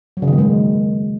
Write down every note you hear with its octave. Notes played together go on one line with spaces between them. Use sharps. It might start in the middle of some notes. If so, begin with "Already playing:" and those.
F#3
C#3
D#3
A#3
G#3